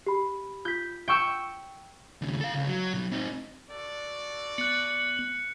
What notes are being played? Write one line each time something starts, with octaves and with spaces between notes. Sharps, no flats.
G4 B5
F4 G6 B6
G5 C#6 E6
D#2 C#3
A4 F5
C#2
F#3
B1 F#3
C4 D#4
F#4 A4 D5
B3 F#6 C#7